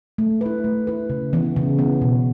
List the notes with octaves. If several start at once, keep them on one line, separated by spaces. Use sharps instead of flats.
A3
E4 B4
A3
E4 B4
C#3
E3 B3
C#3
E3 B3
B2